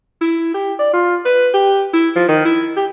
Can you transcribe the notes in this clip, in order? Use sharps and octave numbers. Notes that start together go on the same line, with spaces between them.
E4
G4
D5
F4
B4
G4
E4
F3
D#3
E4
G4